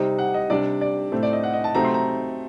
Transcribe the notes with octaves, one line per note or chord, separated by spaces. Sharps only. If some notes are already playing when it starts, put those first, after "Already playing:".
Already playing: C3 G3 C4 D#4
F#5
D#5
C3 G3 D4 D5
D5
A2 A3 C4
D5
D#5
F#5
D#5
A5
C3 F#3 A3 C4 D#4 A#5
C6
A#5